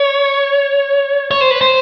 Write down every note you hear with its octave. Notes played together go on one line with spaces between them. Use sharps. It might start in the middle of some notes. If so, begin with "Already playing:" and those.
Already playing: C#5
C#5
C5
B4
C5